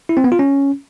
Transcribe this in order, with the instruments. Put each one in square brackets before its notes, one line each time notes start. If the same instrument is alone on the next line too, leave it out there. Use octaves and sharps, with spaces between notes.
[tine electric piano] E4
C4
B3
F4
C#4